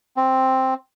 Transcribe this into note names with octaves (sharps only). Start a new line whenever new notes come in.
C4